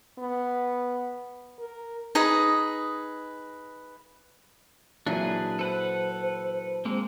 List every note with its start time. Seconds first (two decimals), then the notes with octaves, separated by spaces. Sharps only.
0.19 B3
1.59 A#4
2.15 D#4 G#4 B4 D#5
5.07 A#2 E3 F#3 D4 G#4 B4
5.59 A4 B4 C5 F#5
6.85 G#3 A#3 C4